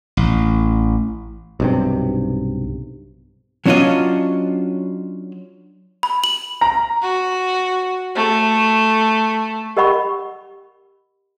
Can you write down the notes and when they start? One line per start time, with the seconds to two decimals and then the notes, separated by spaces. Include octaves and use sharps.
0.17 A1
1.60 B1 G2 C3
3.66 F#3 C#4 D4 F4 F#4 D#5
6.03 B5
6.24 F#7
6.61 A#5
7.02 F#4
8.15 A3
9.77 G4 A#4 D#5 F#5 B5 C#6